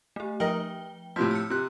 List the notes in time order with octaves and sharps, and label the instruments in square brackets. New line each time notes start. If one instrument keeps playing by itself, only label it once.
[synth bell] A3 G4
[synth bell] F3 G5 G7 [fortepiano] A#4 D#5
[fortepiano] A2 C3 F3 [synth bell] B6
[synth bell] E6 F6 C#7
[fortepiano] C3 F#6